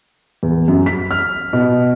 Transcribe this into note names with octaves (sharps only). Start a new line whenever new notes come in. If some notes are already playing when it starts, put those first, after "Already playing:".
E2
F#2
B6
F6
B2